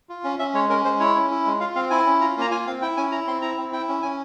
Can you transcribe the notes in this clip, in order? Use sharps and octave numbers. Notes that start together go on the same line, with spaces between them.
F4
C#4
C#4 E5
G#3 C#5
C#4 A#4
G#3 C5
E4 C#5
C#4
E4
G#3
F4 F5
C4 F5
E4 G#5
C#4
F4 A#5
A#3 A#5
F4 G#5
C4 F5
E4 G5
C#4 G#5
E4 A#5
C4 C6
E4 A#5
C4
E4 G5
C#4
C#4 G#5